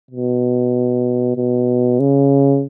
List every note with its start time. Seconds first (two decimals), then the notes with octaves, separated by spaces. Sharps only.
0.11 B2
1.37 B2
1.99 C#3